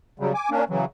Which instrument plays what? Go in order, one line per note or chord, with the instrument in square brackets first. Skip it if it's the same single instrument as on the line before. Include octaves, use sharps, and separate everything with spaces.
[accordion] C#3 F#3 G3
G#5 D6
A#3 C#4 D4
C#3 E3 F#3